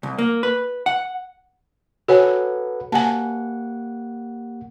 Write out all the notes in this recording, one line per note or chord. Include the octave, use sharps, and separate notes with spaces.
C2
A#3
B4
F#5
F#4 A4 B4 C#5 F#5 G#5
A#3 G4 F#5 G#5 A5